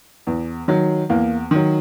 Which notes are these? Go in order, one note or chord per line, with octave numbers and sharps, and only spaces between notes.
E2
D#3 F#3
E2 A#3
D#3 F#3